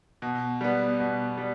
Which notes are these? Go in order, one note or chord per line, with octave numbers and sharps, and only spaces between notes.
B2
G3 B3
B2
G3